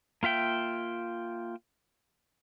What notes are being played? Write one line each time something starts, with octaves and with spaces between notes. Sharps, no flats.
A#3 F4 E5 G5